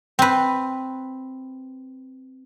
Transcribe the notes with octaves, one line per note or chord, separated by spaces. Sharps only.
C4 B4